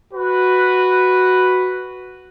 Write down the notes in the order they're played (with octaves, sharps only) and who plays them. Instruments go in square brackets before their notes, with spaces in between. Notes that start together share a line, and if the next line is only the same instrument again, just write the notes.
[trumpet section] F#4 B4